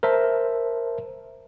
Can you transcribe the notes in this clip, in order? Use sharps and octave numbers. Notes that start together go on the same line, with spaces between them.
A#4 C5 E5 A5